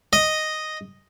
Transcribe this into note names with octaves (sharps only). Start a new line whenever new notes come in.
D#5